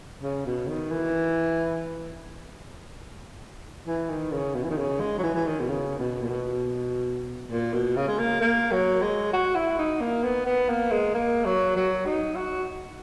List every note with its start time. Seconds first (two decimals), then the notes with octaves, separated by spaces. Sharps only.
0.23 C#3
0.46 B2
0.68 D#3
0.91 E3
3.87 E3
4.09 D#3
4.33 C#3
4.54 B2
4.64 E3
4.70 D#3
4.78 C#3
5.00 G#3
5.18 F#3
5.23 E3
5.35 E3
5.46 D#3
5.60 B2
5.69 C#3
5.98 B2
6.22 A#2
6.29 B2
7.51 A#2
7.74 B2
7.97 C#3
8.08 G#3
8.19 A#3
8.41 A#3
8.72 F#3
9.02 G#3
9.33 F#4
9.55 E4
9.79 D#4
10.01 A#3
10.24 B3
10.46 B3
10.69 A#3
10.91 G#3
11.15 A#3
11.45 F#3
11.76 F#3
12.06 D#4
12.36 F#4